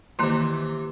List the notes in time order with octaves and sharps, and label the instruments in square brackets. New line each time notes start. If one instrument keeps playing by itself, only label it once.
[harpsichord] C3 E3 [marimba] D#3 A#3 C6